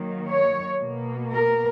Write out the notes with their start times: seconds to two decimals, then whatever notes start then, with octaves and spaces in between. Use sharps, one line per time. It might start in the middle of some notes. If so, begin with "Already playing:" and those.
Already playing: D#3 F#3 A#3
0.28 C#5
0.80 B2 A#3
1.33 A#4